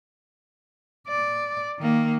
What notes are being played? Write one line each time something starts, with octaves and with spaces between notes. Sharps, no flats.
D5
D#3 A#3